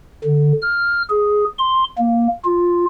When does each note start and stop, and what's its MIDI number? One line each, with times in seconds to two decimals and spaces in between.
0.25 0.53 50
0.62 1.02 89
1.09 1.44 68
1.59 1.84 84
1.98 2.28 58
2.45 2.85 65